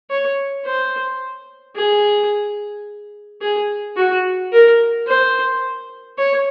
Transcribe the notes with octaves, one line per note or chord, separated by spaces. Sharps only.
C#5
C5
G#4
G#4
F#4
A#4
C5
C#5